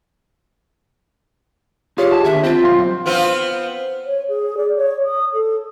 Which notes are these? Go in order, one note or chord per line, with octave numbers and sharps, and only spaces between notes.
F4 G4 G#4 C#5
F#5 A5
D#2 D3 E5
C4 F4
B1 F2 F5 C6
B3 C4 F4
C#5
G#4
D5
C#5
D#6
A4